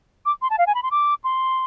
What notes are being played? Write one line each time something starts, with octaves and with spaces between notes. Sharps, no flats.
D6
C6
A5
F5
G#5
B5
C6
D6
C6